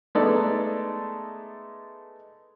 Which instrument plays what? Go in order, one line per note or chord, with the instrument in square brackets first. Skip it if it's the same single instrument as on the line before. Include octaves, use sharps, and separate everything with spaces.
[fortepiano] G#3 A3 B3 D#4 A4 D5